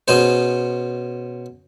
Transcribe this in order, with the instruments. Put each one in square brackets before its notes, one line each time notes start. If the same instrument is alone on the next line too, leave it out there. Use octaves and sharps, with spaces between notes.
[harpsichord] B2 C#4 G#4 C5